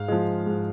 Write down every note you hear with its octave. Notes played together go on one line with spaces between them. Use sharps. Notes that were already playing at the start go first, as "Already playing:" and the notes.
Already playing: G#2 F5
F3 G#3
G#2